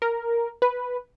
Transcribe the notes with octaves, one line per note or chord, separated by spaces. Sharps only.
A#4
B4